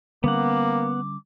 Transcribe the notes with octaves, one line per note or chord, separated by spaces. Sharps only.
D3 G3 A#3 B3 C#4 F#5 D6